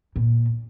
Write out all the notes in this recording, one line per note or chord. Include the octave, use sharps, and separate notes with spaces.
A#2